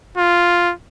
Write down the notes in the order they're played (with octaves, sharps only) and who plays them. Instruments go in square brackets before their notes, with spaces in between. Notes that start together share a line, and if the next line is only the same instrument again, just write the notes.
[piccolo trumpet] F4